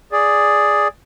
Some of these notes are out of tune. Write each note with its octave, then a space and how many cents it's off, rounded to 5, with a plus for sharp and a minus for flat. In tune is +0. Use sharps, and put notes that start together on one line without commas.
G#4 +0 D5 +0